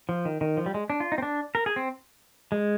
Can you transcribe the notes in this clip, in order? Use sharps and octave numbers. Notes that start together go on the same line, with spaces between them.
F3
D#3
D#3
F3
G3
G#3
D4
F4
D#4
C4
D4
A#4
G#4
C4
G#3